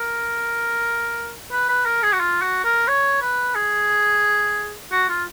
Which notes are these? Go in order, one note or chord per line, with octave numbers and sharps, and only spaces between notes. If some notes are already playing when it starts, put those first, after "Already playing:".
Already playing: A#4
B4
B4
A#4
G#4
F#4
F4
F#4
A#4
C#5
B4
G#4
F#4
F4